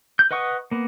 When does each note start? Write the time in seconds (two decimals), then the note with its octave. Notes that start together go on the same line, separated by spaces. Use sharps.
0.19 G6
0.31 B4 D#5 F#5 C#6 D#6
0.71 A#3 B3